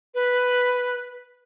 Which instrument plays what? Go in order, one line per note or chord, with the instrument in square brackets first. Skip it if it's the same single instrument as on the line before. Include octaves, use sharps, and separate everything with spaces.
[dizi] B4